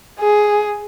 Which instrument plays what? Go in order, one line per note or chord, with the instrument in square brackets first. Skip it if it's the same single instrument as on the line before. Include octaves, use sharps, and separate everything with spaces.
[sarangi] G#4